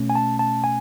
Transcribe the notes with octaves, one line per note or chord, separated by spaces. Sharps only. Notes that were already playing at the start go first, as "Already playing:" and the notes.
Already playing: B2 A3 C#4
G#5
A5
A5
G#5